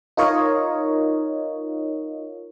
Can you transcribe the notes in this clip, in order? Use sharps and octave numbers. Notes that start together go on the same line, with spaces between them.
D#4 F4 A#4 C#5 D#5 F5